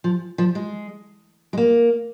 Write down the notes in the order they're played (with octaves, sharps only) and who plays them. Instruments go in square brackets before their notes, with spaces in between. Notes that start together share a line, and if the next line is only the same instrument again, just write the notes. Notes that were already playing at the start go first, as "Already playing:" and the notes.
[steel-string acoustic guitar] F3
F3
G#3
G#3
A#3